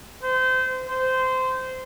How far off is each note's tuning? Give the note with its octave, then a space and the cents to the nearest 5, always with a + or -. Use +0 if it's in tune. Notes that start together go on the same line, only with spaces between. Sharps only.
C5 -25
C5 -20